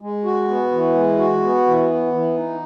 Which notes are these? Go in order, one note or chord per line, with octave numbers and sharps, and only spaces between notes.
G#3
F#4
B3
E3
G#3
F#4
B3
E3
B3
E3
D#4